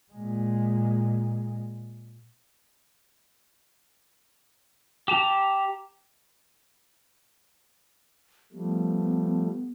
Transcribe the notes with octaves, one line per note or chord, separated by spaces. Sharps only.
A#2 G#3
G4 A5 A#5
F3 G3 A3 B3